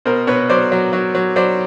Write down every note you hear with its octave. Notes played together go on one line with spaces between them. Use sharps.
B2 A#4 C5
B2 B4 C#5
F#3 C5 D5
F#3
F#3
F#3
F#3 C5 D5